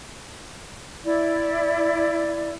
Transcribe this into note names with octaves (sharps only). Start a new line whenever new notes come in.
E4 D5